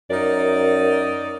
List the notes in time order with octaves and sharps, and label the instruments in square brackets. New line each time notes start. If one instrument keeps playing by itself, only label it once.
[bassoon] F#2 [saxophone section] D#4 A#4 D5